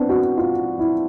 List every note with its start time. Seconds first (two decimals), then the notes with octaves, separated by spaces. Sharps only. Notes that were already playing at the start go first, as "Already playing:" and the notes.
Already playing: B3 C4 D4
0.09 F#4
0.38 F4
0.79 E4